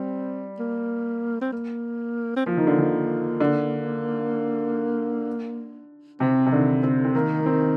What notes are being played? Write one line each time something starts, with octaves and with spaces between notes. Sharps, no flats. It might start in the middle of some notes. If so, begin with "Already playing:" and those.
Already playing: G3 C4
A#3
C4
A#3
C4
F3 A#3
D#3
D3
D#3
D3
C3 C4
C3
D3 D#3
D3 C4
C4
D#3 A#3
A#3
C4